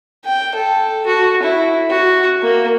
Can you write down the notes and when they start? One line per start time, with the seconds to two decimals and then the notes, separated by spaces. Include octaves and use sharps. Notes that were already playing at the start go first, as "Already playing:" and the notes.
0.25 G5
0.55 A4
1.06 F#4
1.43 E4
1.90 F#4
2.42 A#3